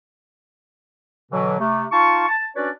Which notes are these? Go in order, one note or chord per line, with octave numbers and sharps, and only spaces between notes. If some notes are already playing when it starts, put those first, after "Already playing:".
B2 D3 E3 F#3
C3 A3
D#4 F4 F5 A5 C#6
A5
C#4 D4 F#4 B4 C#5 D5